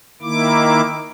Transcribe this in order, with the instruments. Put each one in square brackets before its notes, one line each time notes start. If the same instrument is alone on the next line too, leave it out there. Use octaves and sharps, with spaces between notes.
[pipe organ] D#3 A#3 E4 D6